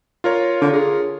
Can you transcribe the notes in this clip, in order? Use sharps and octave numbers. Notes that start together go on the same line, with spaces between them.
F4 A#4 C#5
D3
G#4